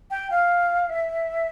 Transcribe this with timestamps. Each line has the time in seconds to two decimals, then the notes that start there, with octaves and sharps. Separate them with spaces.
0.11 G5
0.31 F5
0.89 E5